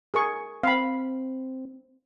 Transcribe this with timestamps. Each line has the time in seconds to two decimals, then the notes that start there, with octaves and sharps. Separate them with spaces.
0.14 G#4 A#4 C#6
0.63 C4 F5 B5